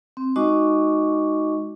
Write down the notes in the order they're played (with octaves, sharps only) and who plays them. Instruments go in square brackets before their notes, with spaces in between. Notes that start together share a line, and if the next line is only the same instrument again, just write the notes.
[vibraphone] C4
G#3 D#4 F#4 D#5 C#6 D6